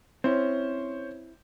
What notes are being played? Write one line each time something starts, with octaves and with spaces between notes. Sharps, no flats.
C4 C#4 E4 C5